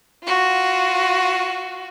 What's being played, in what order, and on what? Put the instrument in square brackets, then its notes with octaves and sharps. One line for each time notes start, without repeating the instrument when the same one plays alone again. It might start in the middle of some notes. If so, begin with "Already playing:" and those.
[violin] F4 F#4